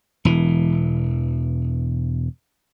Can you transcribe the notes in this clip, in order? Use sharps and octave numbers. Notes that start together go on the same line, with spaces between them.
E1 E3